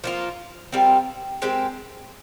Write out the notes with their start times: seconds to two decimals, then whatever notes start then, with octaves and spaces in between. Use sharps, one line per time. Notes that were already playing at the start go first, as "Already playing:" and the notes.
0.04 F3 A#3 F4
0.72 G3 C4 F4 A#4
1.42 G#3 C4 G4 A#4